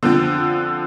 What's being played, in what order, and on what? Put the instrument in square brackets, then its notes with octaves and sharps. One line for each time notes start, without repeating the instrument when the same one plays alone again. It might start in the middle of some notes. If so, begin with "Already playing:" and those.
[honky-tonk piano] D3 F3 C4